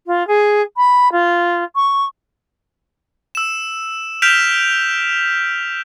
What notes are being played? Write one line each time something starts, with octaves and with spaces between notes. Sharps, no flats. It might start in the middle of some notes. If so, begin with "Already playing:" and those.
F4
G#4
B5
F4
C#6
E6 E7
F6 G6 B6 D7 E7 F7